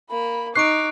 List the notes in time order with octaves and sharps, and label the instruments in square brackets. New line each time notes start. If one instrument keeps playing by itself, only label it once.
[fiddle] A#3 [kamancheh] B5
[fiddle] D#4 [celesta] C#6 C7 [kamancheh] D6 [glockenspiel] F#6 D7